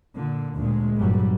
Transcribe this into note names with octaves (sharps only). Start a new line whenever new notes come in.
A#2 D3
D2 A#2 G#3
G1 A#2 F#3 G3